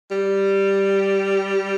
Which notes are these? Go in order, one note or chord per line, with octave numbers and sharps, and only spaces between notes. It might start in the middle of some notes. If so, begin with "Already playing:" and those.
G3